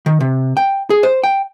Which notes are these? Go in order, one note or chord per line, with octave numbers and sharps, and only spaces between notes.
D#3
C3
G5
G#4
C5
G5